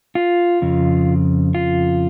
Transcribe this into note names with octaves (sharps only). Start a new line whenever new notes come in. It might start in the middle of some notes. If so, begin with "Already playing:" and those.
F4
F2 C#3
F4